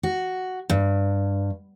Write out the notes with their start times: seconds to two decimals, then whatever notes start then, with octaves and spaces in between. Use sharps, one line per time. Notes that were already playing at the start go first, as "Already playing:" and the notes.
0.03 F#4
0.69 G2